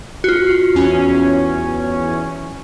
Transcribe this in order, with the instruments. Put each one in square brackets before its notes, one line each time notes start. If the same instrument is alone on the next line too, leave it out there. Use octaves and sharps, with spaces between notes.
[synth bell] F4 F#4
[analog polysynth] E2 C#4